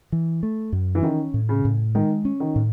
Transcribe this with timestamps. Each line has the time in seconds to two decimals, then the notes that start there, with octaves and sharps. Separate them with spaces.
0.12 E3
0.43 A3
0.72 F#2
0.95 E3
1.03 D#3 C#4
1.34 A2
1.49 C#3
1.65 A2
1.95 D#3 G#3
2.25 C#4
2.40 D#3
2.56 A2